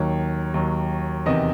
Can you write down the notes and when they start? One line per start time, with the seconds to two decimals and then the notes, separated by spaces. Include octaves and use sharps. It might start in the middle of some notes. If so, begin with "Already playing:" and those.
Already playing: D#2 D#3 F#3 C#5
0.54 D#2 D#3 F#3
1.26 E1 E2 C3 D#3 D#5